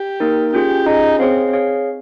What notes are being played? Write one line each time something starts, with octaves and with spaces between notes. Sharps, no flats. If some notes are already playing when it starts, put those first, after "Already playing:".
Already playing: G4
A#3 D#4 A#4
C#4 F4 G4 G#4
C#4 D#4 F4 G#4
C4 G#4 C#5 F5
G#4 C#5 F5